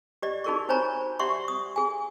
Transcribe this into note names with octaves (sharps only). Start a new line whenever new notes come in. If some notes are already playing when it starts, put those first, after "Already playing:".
G4 D5 D#5
D#4 F#4 G#4 A#4 D5 C#6
D#4 C5 C#5 G#5 A#5 B5
G4 D5 E5 F#5 C6 C#6
D#6
G#4 G#5